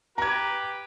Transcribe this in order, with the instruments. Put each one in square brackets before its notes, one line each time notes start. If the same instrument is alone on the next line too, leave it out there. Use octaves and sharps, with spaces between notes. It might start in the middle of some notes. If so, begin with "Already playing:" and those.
[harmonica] G4 B4 [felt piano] A#5 G#6